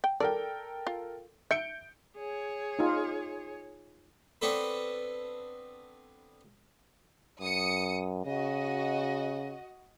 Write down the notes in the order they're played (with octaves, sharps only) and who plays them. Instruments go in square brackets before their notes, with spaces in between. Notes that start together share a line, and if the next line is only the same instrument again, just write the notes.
[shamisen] G5
[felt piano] A4 A#4 G5 [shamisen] D5
[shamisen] F4
[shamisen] E5 [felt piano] G6 C#7 D7
[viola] G#4 C#5
[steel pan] D#4 F4
[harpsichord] B3 C4 D4 A4 B4
[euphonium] F#2 [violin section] D#6 C#7
[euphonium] C#3 [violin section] F#4 D#5